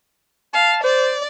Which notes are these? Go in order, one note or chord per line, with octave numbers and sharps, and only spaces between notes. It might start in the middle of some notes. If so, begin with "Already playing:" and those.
F5 A5
C5 D5